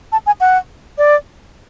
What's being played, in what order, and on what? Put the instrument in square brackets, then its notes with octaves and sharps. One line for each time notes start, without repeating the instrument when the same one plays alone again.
[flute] A5
G#5
F#5
D5